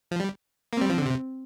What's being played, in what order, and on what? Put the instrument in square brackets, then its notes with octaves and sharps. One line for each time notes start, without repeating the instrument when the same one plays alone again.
[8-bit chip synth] F3
G3
A#3
[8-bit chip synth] G3 [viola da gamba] C4
[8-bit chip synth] F3
D3
C3